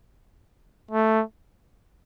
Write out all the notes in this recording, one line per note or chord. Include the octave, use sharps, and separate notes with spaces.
A3